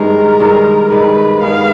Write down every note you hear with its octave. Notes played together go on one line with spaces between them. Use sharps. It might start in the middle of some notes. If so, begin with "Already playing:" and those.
Already playing: G2 D#3 G#3 A#4
G2 D#3 G#3
G2 D#3 G#3 B4
G2 D#3 G#3 B3 F5